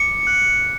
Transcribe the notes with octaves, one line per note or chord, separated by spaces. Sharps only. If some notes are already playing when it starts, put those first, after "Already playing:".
Already playing: D6 C#7
F#6